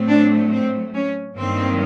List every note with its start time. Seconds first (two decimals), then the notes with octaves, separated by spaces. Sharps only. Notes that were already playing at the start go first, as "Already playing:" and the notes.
Already playing: A2 F#3 A3 C4
0.08 D4
0.51 C4
0.94 C#4
1.37 G2 D#3 F#3 A#3 C4